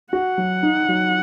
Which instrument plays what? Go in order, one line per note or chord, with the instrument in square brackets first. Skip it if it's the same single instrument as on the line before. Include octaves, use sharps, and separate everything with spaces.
[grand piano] F#4 [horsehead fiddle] F#5
[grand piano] F#3
D#4
F#3